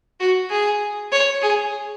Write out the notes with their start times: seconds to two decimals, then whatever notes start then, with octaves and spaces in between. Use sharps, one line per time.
0.20 F#4
0.50 G#4
1.12 C#5
1.42 G#4